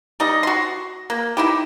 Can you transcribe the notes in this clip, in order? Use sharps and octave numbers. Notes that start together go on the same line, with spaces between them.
G3 D#4 D#5
F#4 C6
A#3
D#4 E4 G4